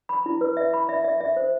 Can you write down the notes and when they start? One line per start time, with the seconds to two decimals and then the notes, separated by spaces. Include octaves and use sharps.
0.09 B5
0.26 E4
0.41 B4
0.57 E5
0.74 B5
0.89 E5
1.04 E5
1.21 E5
1.36 C5